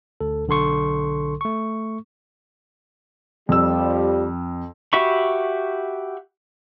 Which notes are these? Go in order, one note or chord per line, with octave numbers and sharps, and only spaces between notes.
D2 A4
B1 D3 A4 C6 C#6
A3 C#6
F2 F3 G3 E6
F#4 G4 E5 B5 C#6